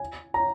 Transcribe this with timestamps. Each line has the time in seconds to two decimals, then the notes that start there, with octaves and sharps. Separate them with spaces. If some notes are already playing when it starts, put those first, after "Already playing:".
Already playing: G#5
0.34 A#5